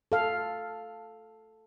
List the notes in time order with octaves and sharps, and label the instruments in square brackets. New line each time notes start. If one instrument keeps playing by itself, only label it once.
[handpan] A4 F5